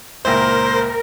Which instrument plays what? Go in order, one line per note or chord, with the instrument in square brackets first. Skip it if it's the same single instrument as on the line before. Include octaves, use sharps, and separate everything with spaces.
[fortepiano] C#2 A#2 E4 [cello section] A#4 [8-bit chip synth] C5